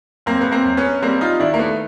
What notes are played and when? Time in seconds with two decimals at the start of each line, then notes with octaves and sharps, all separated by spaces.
0.26 F#2 A#3 C4
0.41 B3
0.52 A#3 C4
0.64 F#2
0.77 B3 C#4
1.02 G3 A#3 C4
1.21 D#4 F4
1.40 D#3 D4 E4
1.54 A#3
1.59 A3 B3